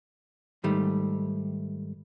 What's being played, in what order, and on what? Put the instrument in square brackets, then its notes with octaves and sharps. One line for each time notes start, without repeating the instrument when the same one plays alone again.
[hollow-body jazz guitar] G#2 D#3 G3 A3